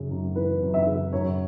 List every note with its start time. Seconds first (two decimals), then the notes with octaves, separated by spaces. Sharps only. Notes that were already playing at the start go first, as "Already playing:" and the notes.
Already playing: F#2 C#3
0.10 F#2
0.36 E3 B4
0.62 F#2
0.74 E5
0.86 C#3
1.13 F#2 C#5